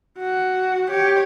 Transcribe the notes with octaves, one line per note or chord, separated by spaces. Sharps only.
F#4
G4 C#5